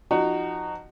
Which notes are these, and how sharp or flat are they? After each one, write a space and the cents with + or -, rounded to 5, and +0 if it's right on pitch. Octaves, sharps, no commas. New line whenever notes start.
F3 +0 D#4 -20 F#4 +15